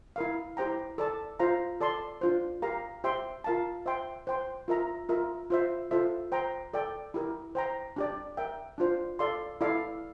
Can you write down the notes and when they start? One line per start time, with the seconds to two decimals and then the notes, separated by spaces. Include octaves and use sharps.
0.16 E4 A#4 F5
0.57 E4 G4 C5 G5 A#5
0.98 A4 D5 A5
1.40 F4 C5 F5 A#5
1.81 A4 D5 A5 C6
2.21 D4 F4 C5
2.62 G4 A#4 F5 A#5
3.04 G4 C5 E5 G5 C6
3.44 F4 A#4 F5 A5
3.86 C5 E5 G5 C6
4.27 C5 G5 C6
4.68 F4 A#4 E5 A#5
5.09 F4 A#4 E5 A#5
5.50 F4 C5 E5
5.91 F4 A4 C5 E5
6.32 C5 G5 A#5
6.73 A4 D5 G5
7.14 E4 G4 A#4
7.55 C5 G5 A#5
7.96 D4 G4 D5
8.37 A#4 E5 G5
8.78 D4 F4 C5
9.19 A4 D5 F5 C6
9.61 E4 A4 D5 F5